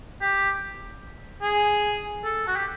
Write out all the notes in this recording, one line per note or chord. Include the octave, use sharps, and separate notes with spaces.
G4
G#4
A4
F#4
G4